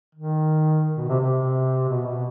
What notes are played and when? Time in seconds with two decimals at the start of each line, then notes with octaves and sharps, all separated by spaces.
0.15 D#3
0.96 B2
1.09 C3
1.20 C3
1.89 B2
2.06 B2